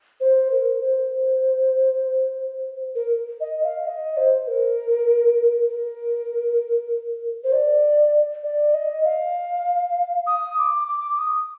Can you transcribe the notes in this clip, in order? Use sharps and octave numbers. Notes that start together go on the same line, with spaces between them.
C5
A#4
C5
A#4
D#5
F5
D#5
C5
A#4
A#4
C5
D5
D5
D#5
F5
D#6
D6
D6
D#6